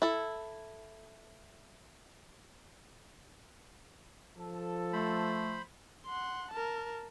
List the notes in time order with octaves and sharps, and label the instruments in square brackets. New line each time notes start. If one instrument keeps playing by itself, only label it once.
[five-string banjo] E4 A4
[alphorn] F3 [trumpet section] A4
[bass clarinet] A3 [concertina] C5 B5
[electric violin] F#5 C6
A#4 A5